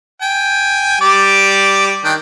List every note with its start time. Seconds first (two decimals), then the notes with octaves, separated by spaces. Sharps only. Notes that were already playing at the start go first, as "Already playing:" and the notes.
0.22 G5 G#5
1.01 G3 D5 D6
2.05 D#3 D4 G5